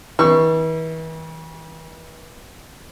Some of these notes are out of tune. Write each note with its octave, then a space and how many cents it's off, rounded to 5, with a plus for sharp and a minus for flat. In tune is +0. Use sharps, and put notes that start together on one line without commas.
E3 -40 C#6 +0 E6 +45